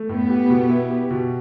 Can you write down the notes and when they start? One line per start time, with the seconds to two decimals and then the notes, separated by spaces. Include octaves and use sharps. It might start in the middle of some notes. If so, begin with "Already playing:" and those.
Already playing: A3
0.09 A2 B3
0.30 G4
0.50 B2
0.69 E4
0.90 G4
1.11 B2